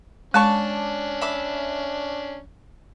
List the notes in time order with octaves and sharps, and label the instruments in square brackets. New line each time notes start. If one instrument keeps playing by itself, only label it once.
[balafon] G#3 [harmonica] C#4 D4 [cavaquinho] D5 A5 C#6
[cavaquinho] E5 B5 D6